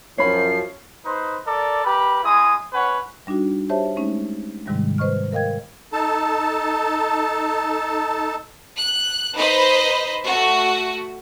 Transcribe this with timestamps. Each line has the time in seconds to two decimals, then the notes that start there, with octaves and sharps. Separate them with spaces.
0.18 F#2 F3 C#4 B5 C7
1.05 D#4 B4 C5
1.46 A4 A#4 D5
1.84 G4 A#4 B4 B5
2.23 G#3 E4 G#4 D#6
2.73 C#4 B4 C#5 F#5
3.27 G3 D4 D#4 F#4
3.70 G4 C5 C#5 E5 A5
3.96 G#3 A3 C#4 D#4
4.66 G#2 C3 D#3 G3 G#3
4.98 B4 C5 D#5 C#6 F6
5.32 A#4 D#5 F5 G5 G#6
5.93 D#4 A4 A5
8.78 F#6
9.35 D#4 B4 C5 D#5 B5
10.25 A3 F#4